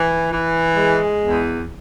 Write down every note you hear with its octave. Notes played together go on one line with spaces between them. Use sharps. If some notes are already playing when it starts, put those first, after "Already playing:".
Already playing: E3
E3
G#3
E2